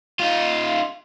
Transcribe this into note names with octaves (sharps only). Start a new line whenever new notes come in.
D#4 F4